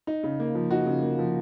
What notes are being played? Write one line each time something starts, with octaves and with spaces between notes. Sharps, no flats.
D#4
C#3
A#3
F3
D#4 F#4
C#3
A#3
F3